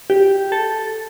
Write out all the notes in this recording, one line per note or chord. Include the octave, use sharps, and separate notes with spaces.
G4
A4